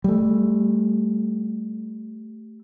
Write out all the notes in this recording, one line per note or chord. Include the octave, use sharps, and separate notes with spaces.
G3 A3